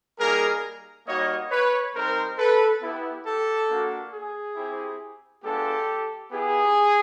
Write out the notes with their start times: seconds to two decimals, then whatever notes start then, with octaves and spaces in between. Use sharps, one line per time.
0.19 G3 A#3 D#4 G#4 A#4
1.07 G3 A#3 D#4 F#4 C#5 D#5
1.51 B4 C#5
1.94 G3 C4 D#4 A#4 C5
2.37 A4 B4
2.81 B3 E4 G4
3.25 G4 A4
3.69 A#3 D4 F#4
4.12 G#4
4.56 C4 E4 G4
5.43 G#3 B3 D4 F4 G4 A4
6.31 B3 E4 G4 G#4